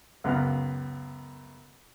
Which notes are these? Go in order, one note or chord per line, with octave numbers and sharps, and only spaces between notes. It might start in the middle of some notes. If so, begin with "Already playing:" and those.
C#2 F#2 B3 F5 A#5 F6